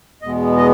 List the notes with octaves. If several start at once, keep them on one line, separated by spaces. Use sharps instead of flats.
E2 B2 G#3 B3 D#5
D#5